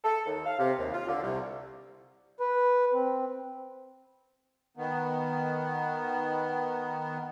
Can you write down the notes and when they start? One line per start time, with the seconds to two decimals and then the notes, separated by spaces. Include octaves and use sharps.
0.04 A4
0.26 D#2
0.46 F5
0.59 C3
0.78 D#2
0.93 F4
1.08 D3
1.22 C2
2.40 B4
2.93 C4
4.77 D#3 B3